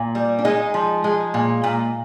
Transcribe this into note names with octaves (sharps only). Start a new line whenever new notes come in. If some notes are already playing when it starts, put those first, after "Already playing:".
Already playing: A#2
G3
D4
G#3 D#4
F3
G#3
A#2
A#2